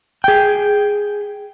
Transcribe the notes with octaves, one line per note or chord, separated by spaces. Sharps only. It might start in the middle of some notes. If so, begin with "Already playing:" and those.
G#4 G5